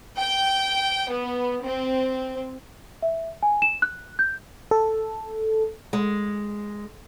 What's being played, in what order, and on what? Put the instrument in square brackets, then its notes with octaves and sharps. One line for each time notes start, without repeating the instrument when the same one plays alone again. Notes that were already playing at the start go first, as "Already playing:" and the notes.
[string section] G5
B3
C4
[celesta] E5
G#5
E7
F#6
G6
[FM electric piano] A4
[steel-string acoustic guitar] G#3